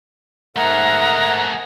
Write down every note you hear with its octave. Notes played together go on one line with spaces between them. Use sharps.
G#2 A3 G#4 A#4 E5 F#5 A#5